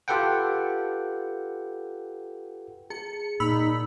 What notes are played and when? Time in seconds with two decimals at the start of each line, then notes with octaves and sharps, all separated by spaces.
0.08 F4 G4 A4 B4 F#5 G5
2.90 G#4 C#7
3.40 A#2 D#4 B5 E6